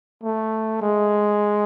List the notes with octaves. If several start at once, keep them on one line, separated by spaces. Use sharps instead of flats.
A3
G#3